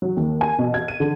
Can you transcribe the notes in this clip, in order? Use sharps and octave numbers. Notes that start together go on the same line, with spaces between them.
F#3
D#2
G#5
B2
G#6
D#7
D3